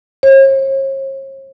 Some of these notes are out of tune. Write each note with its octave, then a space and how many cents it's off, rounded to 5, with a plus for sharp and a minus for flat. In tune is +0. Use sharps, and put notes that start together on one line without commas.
C#5 -45